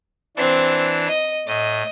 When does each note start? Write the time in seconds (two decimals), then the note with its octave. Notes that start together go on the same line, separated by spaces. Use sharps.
0.37 E3 C4 D4
1.08 D#5
1.47 A2 D#5